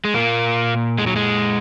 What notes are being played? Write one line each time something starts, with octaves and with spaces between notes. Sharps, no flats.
G#3
A#2 A#3
G#3
F#3
G#3